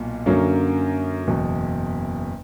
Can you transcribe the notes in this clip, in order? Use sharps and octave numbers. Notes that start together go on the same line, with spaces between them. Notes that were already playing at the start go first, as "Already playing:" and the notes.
Already playing: B1 A#2
F#2 D3 F#3 A#3 C#4
F#1 E2 B2